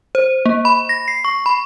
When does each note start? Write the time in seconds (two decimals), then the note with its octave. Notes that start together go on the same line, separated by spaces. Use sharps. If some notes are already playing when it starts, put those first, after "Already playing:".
0.15 C5
0.46 A#3
0.65 B5
0.89 A#6
1.08 C7
1.25 C#6
1.46 B5